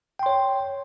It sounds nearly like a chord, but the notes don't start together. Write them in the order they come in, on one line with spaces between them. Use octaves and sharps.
G5 C6 C#5